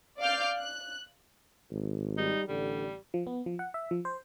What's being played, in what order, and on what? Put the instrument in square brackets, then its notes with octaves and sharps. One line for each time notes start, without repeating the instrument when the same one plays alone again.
[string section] D5 F5 D6 F6 G6
F#6
[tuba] G#1
[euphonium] G3 [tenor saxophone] D#4
[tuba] A1 [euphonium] D3 [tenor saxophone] G3
[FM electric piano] F3
B3
F3
F#5
E5
F3
C5